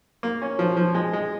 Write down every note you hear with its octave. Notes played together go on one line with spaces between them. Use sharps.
A#3
C#4
F3
F3
G#3
G#3